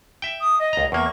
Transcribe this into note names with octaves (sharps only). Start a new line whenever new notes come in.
E5 G5
D#6
D#5
C#2 A#5
E2 A#3 C#6